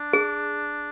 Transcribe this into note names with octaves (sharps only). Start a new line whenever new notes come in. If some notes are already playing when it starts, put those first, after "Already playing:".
Already playing: D4
G#4